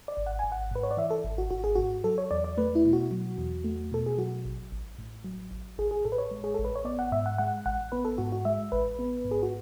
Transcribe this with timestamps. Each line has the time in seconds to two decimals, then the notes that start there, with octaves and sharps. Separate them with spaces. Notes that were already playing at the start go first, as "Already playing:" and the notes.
0.08 D5
0.17 G#1
0.26 F#5
0.39 G#1 G#5
0.52 F#5
0.71 G#2 B4
0.83 C#5
0.91 D5
0.97 E3 E5
1.11 A4
1.24 G#1
1.38 F#4
1.51 G#1 F#4
1.64 G#4
1.76 G#2 F#4
2.04 F#3 A4
2.18 C#5
2.31 E2 D5
2.44 D5
2.58 A3 B4
2.75 E4
2.85 B2
2.93 F#4
3.11 F#3
3.38 E2
3.64 A3
3.91 B2 A4
4.06 G#4
4.18 F#3 F#4
4.45 A1
4.72 A1
4.98 A2
5.24 F#3
5.51 A1
5.78 A1 G#4
5.91 G#4
6.05 A2 A4
6.12 B4
6.18 C#5
6.31 G#3
6.44 G#4
6.54 A1 A4
6.65 B4
6.76 C#5
6.85 B3 D5
6.99 F#5
7.12 G#2 E5
7.26 F#5
7.38 G#3 F#5
7.66 A1 F#5
7.92 B3 B4
8.05 A4
8.18 G#2 F#4
8.32 F#4
8.45 G#3 E5
8.72 A1 B4
8.99 B3
9.25 G#2
9.31 G#4
9.43 F#4